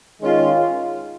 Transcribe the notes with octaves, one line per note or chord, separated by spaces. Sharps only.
D#3 G#3 C#4 F4